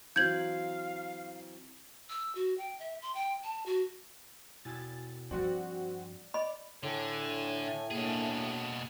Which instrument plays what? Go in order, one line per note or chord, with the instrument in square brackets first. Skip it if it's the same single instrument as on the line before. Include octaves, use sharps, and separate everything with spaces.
[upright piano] E3 F#3 C4 [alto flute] F5 [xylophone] G6 G#6 F#7
[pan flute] E6
F#4
G5
E5
C6
G5
A5
F#4
[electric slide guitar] B2 E4 G#5 [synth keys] A6
[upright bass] G2 F3 [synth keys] C4 F#4 [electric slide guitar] D5
[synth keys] D5 [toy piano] D#5 B5
[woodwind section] A2 [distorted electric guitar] D3 [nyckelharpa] G#5
[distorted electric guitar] B2 G#4 [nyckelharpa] A#3 D4